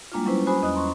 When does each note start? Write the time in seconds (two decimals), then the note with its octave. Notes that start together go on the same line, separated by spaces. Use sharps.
0.12 G3 G#3 A#3 D4 E4 F4
0.26 F#3 G3 C#4 E4 B4 C5
0.47 F#4 C5 G#5 B5 D#6
0.62 E2 C#4 D#5 D#6 F#6
0.74 A#5 C6 C#6